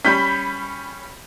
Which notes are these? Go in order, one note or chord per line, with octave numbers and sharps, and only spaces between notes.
G3 C#4 B5 G6 B6